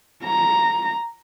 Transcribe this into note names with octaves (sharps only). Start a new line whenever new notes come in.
A#5